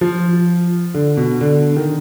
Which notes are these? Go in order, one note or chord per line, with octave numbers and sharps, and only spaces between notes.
F3
D3
B2
D3
D#3